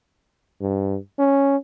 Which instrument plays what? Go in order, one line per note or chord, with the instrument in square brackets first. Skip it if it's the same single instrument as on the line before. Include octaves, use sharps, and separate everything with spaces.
[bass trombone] G2
C#4